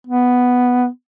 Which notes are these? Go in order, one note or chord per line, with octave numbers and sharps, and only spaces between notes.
B3